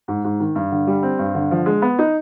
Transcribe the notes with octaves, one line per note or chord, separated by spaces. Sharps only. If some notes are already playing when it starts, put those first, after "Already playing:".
G#2
G#2
D#3
G2
D3
G3
C4
G2
D3
F3
G#3
B3
D#4